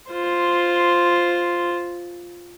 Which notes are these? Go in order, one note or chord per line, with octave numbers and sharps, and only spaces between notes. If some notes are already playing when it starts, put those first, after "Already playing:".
F4 C5